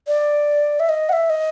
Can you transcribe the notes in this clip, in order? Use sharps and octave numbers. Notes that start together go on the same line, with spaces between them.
D5
E5
D#5
F#5
E5
D#5